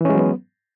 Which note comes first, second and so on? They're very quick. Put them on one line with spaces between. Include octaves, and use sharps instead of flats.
E3 C#4 G#3 F#3 B3